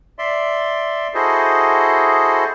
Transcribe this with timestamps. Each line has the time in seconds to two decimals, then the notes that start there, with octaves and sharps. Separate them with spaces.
0.19 D5 E5 C6
1.14 E4 F#4 G#4 A4 C5 D#5